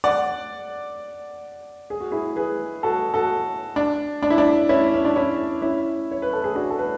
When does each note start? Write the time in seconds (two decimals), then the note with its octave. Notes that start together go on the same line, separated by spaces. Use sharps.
0.04 D5 F#5
1.90 G#4
2.00 F#4
2.12 E4 G#4
2.36 G#4 B4
2.83 F#4 A4
3.14 F#4 A4
3.76 D4
4.22 D4
4.30 E4
4.38 D4
4.69 C#4 E4
4.94 C#4
5.05 D4
5.16 C#4 E4
5.62 C#4 E4
6.11 C#5
6.22 B4
6.33 A4
6.44 G#4
6.55 D4 F#4
6.70 A4
6.79 B4